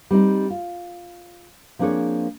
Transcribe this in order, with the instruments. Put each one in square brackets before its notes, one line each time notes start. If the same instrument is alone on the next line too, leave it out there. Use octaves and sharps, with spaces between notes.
[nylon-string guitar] G3 C4 D#4
F4
F3 A#3 C4 D4 G#4 C#5